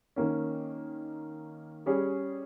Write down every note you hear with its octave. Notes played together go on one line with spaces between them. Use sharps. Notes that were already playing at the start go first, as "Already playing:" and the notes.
D#3 A#3 C#4
G3 C#4 G#4